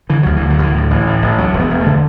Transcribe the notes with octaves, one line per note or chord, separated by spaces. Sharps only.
D3 E3
D2 F#3
E3
D3
F#3
D2 E3
A2 F#3
A1 E3
A2
A1
D2 F#3
E1
B3
E1
A3
D3